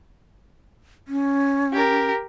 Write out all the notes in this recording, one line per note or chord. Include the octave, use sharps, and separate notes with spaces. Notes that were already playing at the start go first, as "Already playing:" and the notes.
C#4
G4 A#4